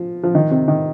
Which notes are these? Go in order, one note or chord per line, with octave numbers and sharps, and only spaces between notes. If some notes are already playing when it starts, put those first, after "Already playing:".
Already playing: F3
F3
D#3
C3
D#3